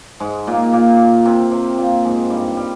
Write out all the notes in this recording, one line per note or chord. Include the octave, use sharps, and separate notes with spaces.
G#2 G#3
A#2 A#3
A#2 A#3
C3 C4
C3 C4
A#2 A#3
G#2 G#3
G2 G3
G3